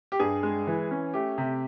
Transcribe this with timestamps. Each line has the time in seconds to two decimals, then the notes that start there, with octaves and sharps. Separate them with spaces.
0.12 G4
0.20 G2 G#4
0.43 G#3
0.67 E3
0.91 C#4
1.14 A3 G4
1.38 C3